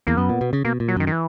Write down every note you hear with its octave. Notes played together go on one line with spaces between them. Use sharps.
E2 A#3
F#2 B3
A#2
B2
C#3
B2 A#3
A#2
F#3
F#2 D#3
D#3
E3